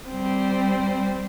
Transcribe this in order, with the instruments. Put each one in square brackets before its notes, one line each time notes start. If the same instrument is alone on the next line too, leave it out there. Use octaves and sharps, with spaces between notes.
[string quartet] G3 C4